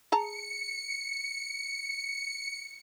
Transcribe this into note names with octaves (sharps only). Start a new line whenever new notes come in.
G#4 A5 A#5 C#7